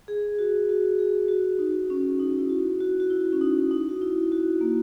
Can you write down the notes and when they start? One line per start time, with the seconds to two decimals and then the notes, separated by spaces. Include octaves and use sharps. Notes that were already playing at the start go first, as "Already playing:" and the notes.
0.08 G#4
0.39 F#4
0.69 F#4
0.99 G#4
1.28 F#4
1.59 D#4
1.90 C#4
2.20 D#4
2.38 E4
2.49 F#4
2.80 F#4
3.00 F#4
3.10 E4
3.33 C#4
3.41 D#4
3.71 D#4
3.89 F#4
4.02 E4
4.32 F#4
4.61 A#3